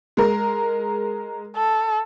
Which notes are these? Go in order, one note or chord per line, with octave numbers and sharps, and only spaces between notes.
G#3 A#4
A4